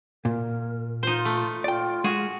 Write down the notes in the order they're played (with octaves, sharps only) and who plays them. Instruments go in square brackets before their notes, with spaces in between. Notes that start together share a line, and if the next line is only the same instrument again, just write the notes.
[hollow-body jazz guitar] A#2 [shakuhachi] A#4
[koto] D#4 C5 [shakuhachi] F4
[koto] A3
[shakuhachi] F4 [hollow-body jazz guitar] D5 G5
[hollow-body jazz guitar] G#3 [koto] F#4 G#4